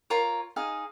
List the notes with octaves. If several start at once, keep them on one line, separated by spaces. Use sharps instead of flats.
F4 A#4 C#5
D#4 G#4 F5